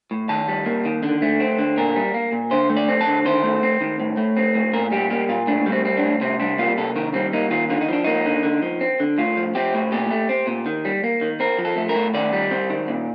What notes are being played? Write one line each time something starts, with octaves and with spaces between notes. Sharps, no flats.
A2
D#3 A5
G3
A#3
D#3
D3
A3
C4
D3
A#2 A#4
G3
A#3
A#2
D3 C5
A3
D5
C4
A5
D3
D#3 C5
A3
C4
D#3
A2
A3
C4
A2
A#2 A#4
G3 G4
A#3 G4
A#2 F4
A2 D4
G3
C4
C4
D4
A2
C3 C4
G3 D4
A#3 F4
C3 A4
D#3 A#4
G3 C4
A#3 D#4
D#3 F4
D3 F4
D#4
F3 D4
A#3 D#4
D3
D3
F3
C4
D3
A2 F4
F3
C4 G4
A2
A#2 G4
A3
C4
A#2
D#3
G3
A#3
D#3
C4 A#4
F3
A4
A3
A#4
A2
D#3 D5
G3
C4
D#3
A#2